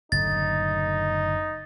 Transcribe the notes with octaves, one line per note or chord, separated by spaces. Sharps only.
F#1 A2 D3 D#4 A6